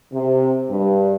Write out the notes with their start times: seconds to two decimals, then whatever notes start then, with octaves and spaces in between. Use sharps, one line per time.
0.13 C3
0.70 G2